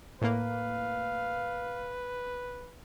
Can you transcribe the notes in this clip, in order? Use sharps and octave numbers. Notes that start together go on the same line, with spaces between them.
A2 A#3 B4 F5